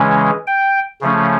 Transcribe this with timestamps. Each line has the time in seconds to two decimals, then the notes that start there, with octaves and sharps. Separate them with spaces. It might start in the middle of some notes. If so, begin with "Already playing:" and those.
Already playing: C#3 E3 G#3 C#4
0.47 G5
1.01 C#3 F3 A3 C#4